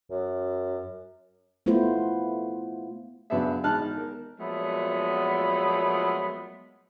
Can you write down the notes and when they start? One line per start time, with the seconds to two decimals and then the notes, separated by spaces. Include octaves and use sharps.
0.11 F#2
1.66 A3 B3 E4 F4 C5
3.30 F#2 C#3 B3 D4 G#4 E5
3.63 G#1 E2 D#4 A5 F6 F#6
3.97 A#4
4.39 A#2 F3 F#3 G#3 A3 B3